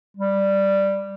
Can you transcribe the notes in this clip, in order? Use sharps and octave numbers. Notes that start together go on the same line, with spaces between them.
G3